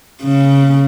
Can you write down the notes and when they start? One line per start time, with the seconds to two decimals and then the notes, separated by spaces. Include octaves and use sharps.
0.23 C#3